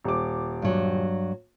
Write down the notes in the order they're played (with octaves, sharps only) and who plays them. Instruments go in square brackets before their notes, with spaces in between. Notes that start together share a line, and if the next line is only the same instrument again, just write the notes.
[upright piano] D#1 D6
[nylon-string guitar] G2 F#3